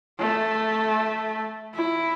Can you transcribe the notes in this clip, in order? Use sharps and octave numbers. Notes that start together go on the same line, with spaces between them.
A3
E4